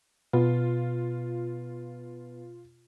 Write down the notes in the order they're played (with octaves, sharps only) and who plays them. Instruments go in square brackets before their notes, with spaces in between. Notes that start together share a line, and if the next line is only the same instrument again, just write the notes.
[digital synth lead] B2 [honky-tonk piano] F4